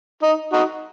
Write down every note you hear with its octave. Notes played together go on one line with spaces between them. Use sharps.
D#4
D#4 F#4